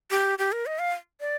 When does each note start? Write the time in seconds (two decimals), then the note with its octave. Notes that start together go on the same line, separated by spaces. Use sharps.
0.11 G4
0.39 G4
0.52 A#4
0.66 D#5
0.79 F5
1.21 D5